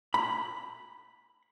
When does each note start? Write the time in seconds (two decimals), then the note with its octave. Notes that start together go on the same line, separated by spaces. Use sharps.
0.14 B5